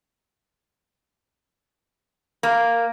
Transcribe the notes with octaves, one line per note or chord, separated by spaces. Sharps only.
A#3